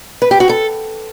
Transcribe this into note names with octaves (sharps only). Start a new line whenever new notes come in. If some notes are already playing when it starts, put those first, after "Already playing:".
B4
G4
F#4
A4